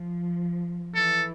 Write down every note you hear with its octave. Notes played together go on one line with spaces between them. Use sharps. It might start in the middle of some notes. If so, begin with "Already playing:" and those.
Already playing: F3
E3 A4